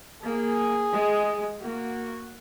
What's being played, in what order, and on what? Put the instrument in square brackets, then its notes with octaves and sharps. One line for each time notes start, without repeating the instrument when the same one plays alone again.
[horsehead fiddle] A#3 [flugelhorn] G#4
[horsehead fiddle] G#3
[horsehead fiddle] A#3 [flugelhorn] F#4